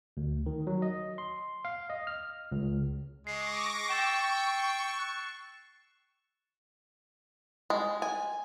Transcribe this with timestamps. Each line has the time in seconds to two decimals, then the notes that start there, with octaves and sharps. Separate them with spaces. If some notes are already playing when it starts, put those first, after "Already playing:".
0.17 D2
0.46 D#3
0.67 F#3
0.82 D#5
1.18 C6
1.65 F5
1.90 D#5
2.07 F6
2.52 C#2
3.27 G#3 C#6 D6 A#6 C7
3.90 G5 C#6 E6 A6 E7
4.99 F#6
7.70 G#3
8.02 G#5